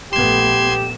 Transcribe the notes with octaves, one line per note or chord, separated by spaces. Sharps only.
A#1 A3 B3 G4 C6 G#6 E7